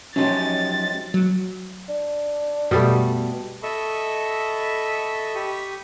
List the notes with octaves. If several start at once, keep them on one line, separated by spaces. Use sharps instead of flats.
F#2 F3 F#3 G#3 C#4 D#4 G4 A6
F#3
D4
F#2 B2 G3 A3
A4 D#5 E5 B5 C#6
G4 B5 C#6 D#6